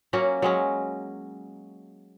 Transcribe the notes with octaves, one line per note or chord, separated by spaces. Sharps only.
F#3 A#3 C#4 F#4
F#3 G#3 C#4